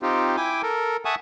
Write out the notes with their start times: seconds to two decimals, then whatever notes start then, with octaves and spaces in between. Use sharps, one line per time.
0.02 C4 D#4 F4 G4
0.37 E4 G5 G#5 D6
0.63 A4 A#4
1.05 E5 F#5 G#5 A5 C#6 D#6